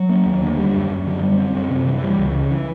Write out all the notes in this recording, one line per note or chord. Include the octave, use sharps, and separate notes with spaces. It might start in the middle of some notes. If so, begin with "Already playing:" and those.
Already playing: F#3
A#3
D#2
D3
G3
F#2
F#2
D3
G3
C4
F#2
C3
E3
G3
C#2
C#3
E3